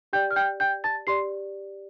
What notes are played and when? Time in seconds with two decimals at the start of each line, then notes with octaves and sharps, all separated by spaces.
0.13 G4 D5 G5 G6
0.31 F6
0.36 G5 G6
0.60 G5 G6
0.84 A5 A6
1.07 G4 D5 C6 C7